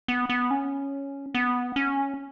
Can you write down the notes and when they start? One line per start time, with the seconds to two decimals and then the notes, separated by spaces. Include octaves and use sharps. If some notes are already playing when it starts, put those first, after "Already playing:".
0.08 B3
0.29 B3
0.51 C#4
1.34 B3
1.76 C#4